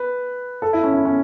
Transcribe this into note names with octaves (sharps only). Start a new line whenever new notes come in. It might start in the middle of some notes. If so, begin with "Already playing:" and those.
Already playing: B4
A4
E4
C#4
E4
C#4